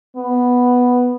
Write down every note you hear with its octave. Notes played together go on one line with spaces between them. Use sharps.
B3